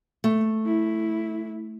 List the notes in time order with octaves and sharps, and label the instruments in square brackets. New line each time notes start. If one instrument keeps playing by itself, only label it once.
[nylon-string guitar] A3
[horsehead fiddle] E4